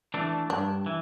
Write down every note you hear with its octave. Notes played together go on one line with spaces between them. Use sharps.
E3 A3 D4
G2 D4
E3